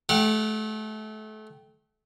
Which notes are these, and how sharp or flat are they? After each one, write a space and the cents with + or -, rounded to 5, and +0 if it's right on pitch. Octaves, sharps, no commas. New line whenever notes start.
A3 -30 G4 +0 F#5 -20